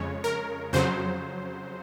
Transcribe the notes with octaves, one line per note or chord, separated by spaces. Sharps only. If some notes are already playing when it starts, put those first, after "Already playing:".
Already playing: F2 C#3 G#3 C#5
A#4
F2 C#3 F#3 C5